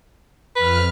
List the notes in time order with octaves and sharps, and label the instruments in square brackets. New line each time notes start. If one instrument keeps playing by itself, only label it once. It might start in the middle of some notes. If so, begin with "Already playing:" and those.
[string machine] F2 F6 [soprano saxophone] B4